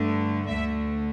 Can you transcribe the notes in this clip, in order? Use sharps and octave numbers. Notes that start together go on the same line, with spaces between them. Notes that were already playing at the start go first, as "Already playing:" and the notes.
Already playing: G2 D3 A3
D2 D3 A3 E5